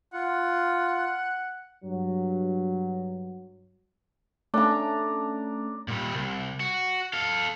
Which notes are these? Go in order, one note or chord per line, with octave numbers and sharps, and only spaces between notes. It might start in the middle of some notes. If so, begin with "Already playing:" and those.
F4 F#5
G2 F#3
A3 C#4 D4 A#5
A#2 G3
C2
F#4
A4 F5